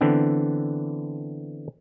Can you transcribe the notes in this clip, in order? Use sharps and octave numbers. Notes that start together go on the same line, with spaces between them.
D3 E3 B3 C4 D4